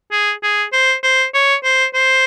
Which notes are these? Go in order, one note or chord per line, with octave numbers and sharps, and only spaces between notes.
G#4
G#4
C5
C5
C#5
C5
C5